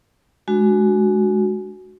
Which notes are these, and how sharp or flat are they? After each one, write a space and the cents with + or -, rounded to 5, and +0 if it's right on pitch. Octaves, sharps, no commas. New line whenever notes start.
G#3 +20 D4 +15 F#4 +0